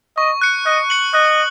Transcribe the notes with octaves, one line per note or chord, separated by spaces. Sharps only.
D#5 C#6
F#6 C#7
D#5 F#6
C#7 F#7
D#5 F#6